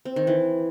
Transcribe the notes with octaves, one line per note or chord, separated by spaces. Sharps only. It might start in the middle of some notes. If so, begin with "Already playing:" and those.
C4
D#3
E3